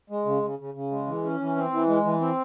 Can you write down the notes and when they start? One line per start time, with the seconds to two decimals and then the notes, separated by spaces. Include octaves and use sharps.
0.10 G#3
0.26 C#3
0.42 C#3
0.59 C#3
0.74 C#3
0.91 G#3
1.07 E3
1.24 C#4
1.39 E3
1.56 C4
1.72 E3
1.87 G#3
2.05 E3
2.20 C4